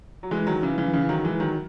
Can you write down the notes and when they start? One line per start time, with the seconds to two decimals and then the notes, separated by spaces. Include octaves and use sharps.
0.23 F#3
0.31 E3 G#3
0.47 D#3 F#3
0.62 C#3 E3
0.78 C#3 E3
0.93 C#3 E3
1.09 D#3 F#3
1.25 E3 G#3
1.40 D#3 F#3